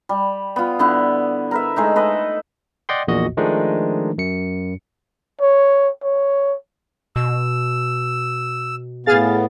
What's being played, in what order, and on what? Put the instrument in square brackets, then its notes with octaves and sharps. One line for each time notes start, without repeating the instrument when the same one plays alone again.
[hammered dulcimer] G3
B3 F4
D3 B3 E4
A#4 B4 E5
G#3 A3 D#4
A4 B4 D#5
[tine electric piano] D5 D#5 F#5 G5 C6
A#1 E2 A#2 F#4 D#5
D#3 F3 G#3 A3 D4 D#4
F#2 C#7
[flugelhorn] C#5
C#5
[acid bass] B2 [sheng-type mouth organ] E6
[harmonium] A2 B3 [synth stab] G#4 F5 A6